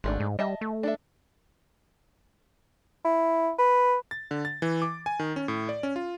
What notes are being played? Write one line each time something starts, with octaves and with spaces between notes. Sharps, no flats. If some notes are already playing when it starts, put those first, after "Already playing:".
G#1 G#3 A3 D4
G#2
G3 D#5 E5 A5
A3
D4 A4 E5
E4
B4
A6
D3
A6
E3
D6
G#5
D#3
C#4
A2
D5
C#4
F4